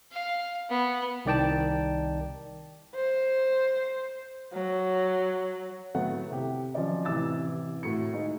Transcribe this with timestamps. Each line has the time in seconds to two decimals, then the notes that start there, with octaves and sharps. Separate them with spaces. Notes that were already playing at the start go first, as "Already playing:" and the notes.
0.12 F5
0.70 B3
1.25 C2 D#3 D5 G5 A5
2.95 C5
4.53 F#3
5.95 A2 F#3 A3 B3 F#5
6.30 C3 E4 G4
6.74 F3 F#3 C#4 D5 D#5
7.05 A1 C3 E3 D6 E6 A6
7.83 A2 F#4 C#7
8.14 G#3 D#4